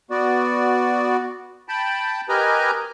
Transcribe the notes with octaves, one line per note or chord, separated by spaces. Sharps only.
B3 F#4 D5
G5 A5 B5
G4 A#4 B4 D#5 G#5 A#5